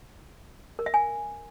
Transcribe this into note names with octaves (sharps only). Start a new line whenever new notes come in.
A#4
E5
G#5